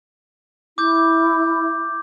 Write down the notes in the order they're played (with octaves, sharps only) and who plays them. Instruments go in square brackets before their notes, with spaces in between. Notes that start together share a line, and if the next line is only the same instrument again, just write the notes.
[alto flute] E4 [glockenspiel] D6 G6